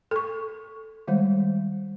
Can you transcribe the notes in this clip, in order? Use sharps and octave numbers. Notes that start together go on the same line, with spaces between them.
A4 C#6
D#3 G3 G#3 C5